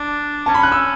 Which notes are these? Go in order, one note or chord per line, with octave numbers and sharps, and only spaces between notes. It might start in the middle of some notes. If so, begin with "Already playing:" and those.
Already playing: D4
C#4 A5
B5
F#6
E6